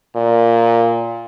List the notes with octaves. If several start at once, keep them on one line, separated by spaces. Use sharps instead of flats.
A#2